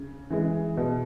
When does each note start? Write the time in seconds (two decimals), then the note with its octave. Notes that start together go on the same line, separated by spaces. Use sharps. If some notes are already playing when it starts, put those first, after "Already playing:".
Already playing: C#3
0.30 E3 G#3
0.77 B2